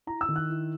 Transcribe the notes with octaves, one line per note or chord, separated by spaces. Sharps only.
E4 A#5
E6
D#3
F#6
E4